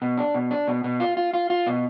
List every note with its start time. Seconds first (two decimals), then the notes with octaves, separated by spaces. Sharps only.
0.02 B2
0.18 D4
0.34 B2
0.51 D4
0.68 B2
0.84 B2
1.00 F4
1.17 F4
1.34 F4
1.50 F4
1.67 B2